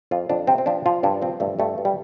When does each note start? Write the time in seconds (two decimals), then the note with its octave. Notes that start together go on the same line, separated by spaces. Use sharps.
0.11 F2 F4
0.30 F2 D4
0.47 C3 C4
0.58 C4
0.66 F3 D4
0.86 F3 F4
1.03 G2 D4
1.22 F3 C4
1.40 G2 A3
1.59 G2 A3
1.78 G2
1.85 G3